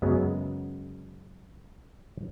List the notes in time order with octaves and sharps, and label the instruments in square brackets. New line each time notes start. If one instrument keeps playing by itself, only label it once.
[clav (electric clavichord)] F#2 C#3 F#3 G#3 B3